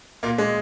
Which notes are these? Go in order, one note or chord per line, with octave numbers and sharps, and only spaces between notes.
A#2 A#3
G#3